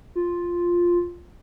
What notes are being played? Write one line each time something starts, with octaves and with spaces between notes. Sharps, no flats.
F4